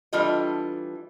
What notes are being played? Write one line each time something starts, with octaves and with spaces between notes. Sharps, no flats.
E3 G3 D4 F4 A4 D#5